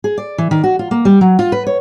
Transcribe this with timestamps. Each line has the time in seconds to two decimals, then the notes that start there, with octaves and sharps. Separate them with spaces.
0.04 G#4
0.18 D5
0.38 E3
0.51 D#3
0.64 F#4
0.79 F4
0.91 A#3
1.05 G3
1.21 F#3
1.39 F4
1.52 B4
1.67 C#5